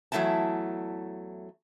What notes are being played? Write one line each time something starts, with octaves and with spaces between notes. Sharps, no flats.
E2 F#3 A3 D#4 E4 A5